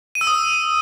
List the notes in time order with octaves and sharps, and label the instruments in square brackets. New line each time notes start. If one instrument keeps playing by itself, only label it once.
[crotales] D#7
E6
D#6